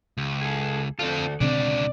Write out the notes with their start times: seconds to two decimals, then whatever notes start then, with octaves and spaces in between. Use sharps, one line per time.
0.17 C#2
0.42 G#4 A4
0.99 D2 C4 F4 A4
1.41 C#2 B2 D3 C4 D4 D5